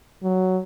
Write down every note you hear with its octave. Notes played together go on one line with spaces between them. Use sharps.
F#3